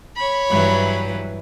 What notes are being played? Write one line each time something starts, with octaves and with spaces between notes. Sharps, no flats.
C#5 B5
G2 E3 F#3